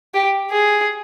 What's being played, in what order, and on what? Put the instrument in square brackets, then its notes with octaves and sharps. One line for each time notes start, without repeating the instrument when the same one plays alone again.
[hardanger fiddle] G4
G#4